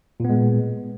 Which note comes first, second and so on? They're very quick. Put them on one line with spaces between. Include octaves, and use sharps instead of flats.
A#2 B3 G#3